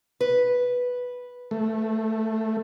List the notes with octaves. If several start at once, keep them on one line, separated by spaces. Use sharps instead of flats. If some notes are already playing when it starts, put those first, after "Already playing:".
B4
A3